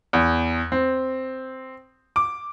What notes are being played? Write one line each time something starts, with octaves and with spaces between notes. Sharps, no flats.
E2
C4
D6